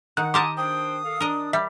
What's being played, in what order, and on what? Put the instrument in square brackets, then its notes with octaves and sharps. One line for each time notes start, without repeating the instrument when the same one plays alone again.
[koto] D#3 [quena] F#5 [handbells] F#6
[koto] G4 A#4 A5 [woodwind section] G#5 D#6 [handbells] C6 D6
[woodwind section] D4 C5 G5 [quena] D#6
[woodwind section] A4 F5
[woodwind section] D4 [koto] A#4 D#5
[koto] G3 [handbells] E5